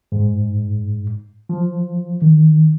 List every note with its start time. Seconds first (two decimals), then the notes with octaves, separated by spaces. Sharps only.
0.12 G#2
1.49 F3
2.22 D#3